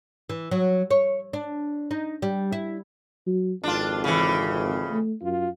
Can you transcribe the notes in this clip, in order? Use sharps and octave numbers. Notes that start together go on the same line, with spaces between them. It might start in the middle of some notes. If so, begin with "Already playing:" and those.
E3
F#3
C#5
D4
D#4
G3
E4
F#3
G#1 F2 D4 F4
C#3 E3
A3
F#2 F4